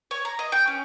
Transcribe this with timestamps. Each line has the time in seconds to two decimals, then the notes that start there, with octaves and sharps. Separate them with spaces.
0.11 C#5
0.25 A#5
0.39 D#5
0.52 G5
0.68 C#4